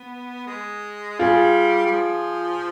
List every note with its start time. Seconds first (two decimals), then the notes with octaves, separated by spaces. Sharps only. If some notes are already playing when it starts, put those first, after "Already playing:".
Already playing: B3
0.47 G#3
1.19 G3 F4 G#4
1.86 G3
1.91 F3